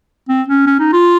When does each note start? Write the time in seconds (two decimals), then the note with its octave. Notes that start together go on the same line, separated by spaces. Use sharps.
0.29 C4
0.48 C#4
0.66 C#4
0.79 D#4
0.93 F4